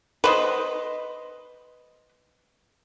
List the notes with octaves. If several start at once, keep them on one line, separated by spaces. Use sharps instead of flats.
B4 C5 D#5